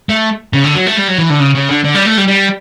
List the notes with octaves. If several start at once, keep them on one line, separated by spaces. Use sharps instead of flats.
A3
C#3
D3
F#3
A3
G3
F#3
E3
D3
C#3
C#3
D3
D3
G3
A3
G3
G3